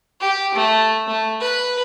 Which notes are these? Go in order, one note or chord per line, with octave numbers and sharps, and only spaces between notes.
G4
A3
A3
B4